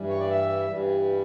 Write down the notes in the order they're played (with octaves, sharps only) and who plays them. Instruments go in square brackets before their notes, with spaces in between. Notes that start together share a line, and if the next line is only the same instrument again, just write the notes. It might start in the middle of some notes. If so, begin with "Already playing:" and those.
Already playing: [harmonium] G2 E3 G3
C#5
D5
E5
G2 E3 G3